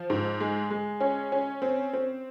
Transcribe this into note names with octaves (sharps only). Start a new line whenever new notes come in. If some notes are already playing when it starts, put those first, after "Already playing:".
Already playing: F3
G#2
G#3
G#3
C#4
C#4
C4
C4